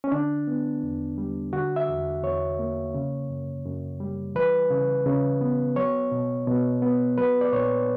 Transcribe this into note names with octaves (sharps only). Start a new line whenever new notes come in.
C#4
D3 D4
B3
E2
G3
D3 F#4
E5
E2
E2 C#5
A#3
C#3
F#2
F#2
G3
E3 B4
C#3
C#3
B3
F#3 C#5
B2
B2
B3
F#3 B4
D5
A#2 C#5